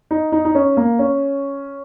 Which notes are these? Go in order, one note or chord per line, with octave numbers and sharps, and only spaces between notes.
D#4
D#4
D#4
C#4
A#3
C#4